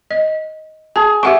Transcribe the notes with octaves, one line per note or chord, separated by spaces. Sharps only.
D#5
G#4 A5
G4 E5 F#5 C#6 D6